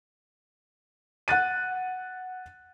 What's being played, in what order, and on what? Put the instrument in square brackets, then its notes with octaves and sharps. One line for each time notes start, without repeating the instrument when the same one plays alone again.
[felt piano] F#5 F#6 A6 D#7